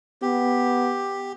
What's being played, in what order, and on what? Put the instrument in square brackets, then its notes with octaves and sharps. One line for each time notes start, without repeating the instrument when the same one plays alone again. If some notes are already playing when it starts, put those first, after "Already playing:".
[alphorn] B3 [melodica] G4